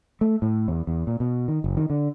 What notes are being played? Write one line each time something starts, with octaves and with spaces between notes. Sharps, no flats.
A3
A2
E2
E2
A#2
B2
D#3
F#1
D#3
D3